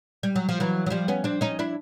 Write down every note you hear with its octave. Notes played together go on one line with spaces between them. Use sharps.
G3
F#3
F3
E3 F#3
F#3
F3 G3
B3 C#4
C4 D4
C#4 D#4
D4 E4